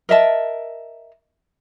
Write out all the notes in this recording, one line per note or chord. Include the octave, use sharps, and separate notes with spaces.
A#4 D#5 E5 A5